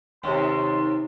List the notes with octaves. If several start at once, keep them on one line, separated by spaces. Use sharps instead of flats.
D#2 C3 C#4 C6